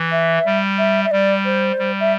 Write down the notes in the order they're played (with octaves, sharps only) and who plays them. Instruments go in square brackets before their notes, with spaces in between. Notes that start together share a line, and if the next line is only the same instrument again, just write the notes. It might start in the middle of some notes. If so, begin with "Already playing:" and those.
Already playing: [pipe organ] E3
[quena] E5
[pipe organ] G3
[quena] E5
E5
[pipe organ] G3 [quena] D5
[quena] C5
[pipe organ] G3
[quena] E5